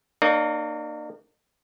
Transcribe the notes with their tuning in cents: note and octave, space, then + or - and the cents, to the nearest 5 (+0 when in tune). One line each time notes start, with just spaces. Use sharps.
A#3 +0 D#4 -45 C#5 +45